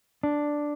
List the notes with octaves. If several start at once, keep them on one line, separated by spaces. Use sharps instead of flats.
D4